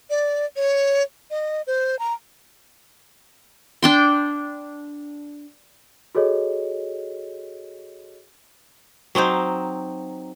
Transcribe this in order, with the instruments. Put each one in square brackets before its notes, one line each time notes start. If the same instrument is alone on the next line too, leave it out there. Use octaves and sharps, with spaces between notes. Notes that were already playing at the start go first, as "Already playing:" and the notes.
[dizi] D5
C#5
D#5
C5
A#5
[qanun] D4 G5 C6
[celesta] F#4 G#4 A4 C#5 D#5
[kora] F#3 C4 D#4 C5